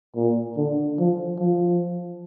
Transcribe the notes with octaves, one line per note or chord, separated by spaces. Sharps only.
A#2
D3
F3
F3